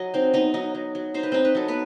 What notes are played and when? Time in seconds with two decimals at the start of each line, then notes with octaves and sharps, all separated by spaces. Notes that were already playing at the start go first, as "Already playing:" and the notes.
Already playing: F#3 D#5
0.14 C4 D#4 C5
0.34 B3 D#4 D#5
0.54 F#3 D#4 D#5
0.74 F#3
0.95 F#3
1.14 D#4 C5
1.23 B4
1.32 C4 D#4 C5
1.45 B4
1.55 F#3 A4
1.68 B3 B4